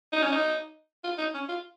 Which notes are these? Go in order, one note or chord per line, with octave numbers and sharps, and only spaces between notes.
D#4
C#4
D#4
F4
D#4
C#4
F4